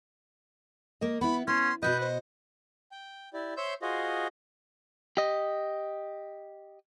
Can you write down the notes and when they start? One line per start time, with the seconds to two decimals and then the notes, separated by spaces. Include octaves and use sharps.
1.01 A#3 A#4 D#5
1.21 B3 E4 B5
1.47 B3 C#4 C6
1.83 B2 F#4 B4 D#5 G6
2.00 C5
2.92 G5
3.33 E4 G4 D5
3.57 C5 C#5 E5 C6 E6 G6
3.82 F4 F#4 G#4 C5 D#5
5.17 G4 D#5